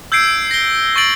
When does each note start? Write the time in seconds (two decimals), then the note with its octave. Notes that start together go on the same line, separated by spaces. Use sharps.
0.12 E6 G6 G#6 C7 D7
0.27 D7
0.51 A#6 G7
0.96 C#6 G#6 A6 D7 F#7